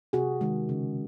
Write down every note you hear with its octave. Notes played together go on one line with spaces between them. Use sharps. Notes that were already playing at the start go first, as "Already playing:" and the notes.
C3 F#4 G#4
D#3 G#3
C#3